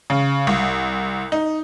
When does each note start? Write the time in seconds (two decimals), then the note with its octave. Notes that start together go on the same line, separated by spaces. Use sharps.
0.10 C#3
0.47 C2
1.32 D#4